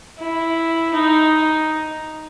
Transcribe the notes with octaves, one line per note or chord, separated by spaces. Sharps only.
E4
D#4